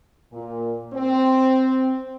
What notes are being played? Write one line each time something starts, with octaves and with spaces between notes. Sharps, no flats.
A#2
C4